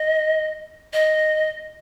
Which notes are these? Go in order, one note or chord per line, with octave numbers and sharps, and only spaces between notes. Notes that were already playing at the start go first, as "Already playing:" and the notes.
Already playing: D#5
D#5